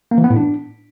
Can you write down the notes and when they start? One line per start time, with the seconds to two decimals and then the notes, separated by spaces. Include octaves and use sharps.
0.11 A#3
0.18 E3
0.24 B3
0.30 A2
0.37 D4